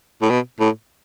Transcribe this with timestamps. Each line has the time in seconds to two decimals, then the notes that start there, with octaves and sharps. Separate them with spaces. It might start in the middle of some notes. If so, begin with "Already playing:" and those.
0.22 A2
0.30 B2
0.60 A2